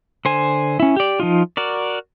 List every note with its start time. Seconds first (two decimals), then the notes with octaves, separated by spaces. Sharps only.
0.25 D3 C5 G#5
0.80 C#4 E4
0.96 G4 D5
1.20 F3 D#4 F4
1.57 F#4 A#4 D5